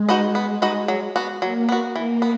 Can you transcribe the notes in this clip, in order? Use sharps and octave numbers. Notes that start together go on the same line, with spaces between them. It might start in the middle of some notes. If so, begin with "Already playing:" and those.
Already playing: G#3
D#4 F#4 B4 D#5
B3
D#4 F#4 B4 D#5
F#3
B3 F#4
F#3 A#3
B3 F#4
E3 A#3
B3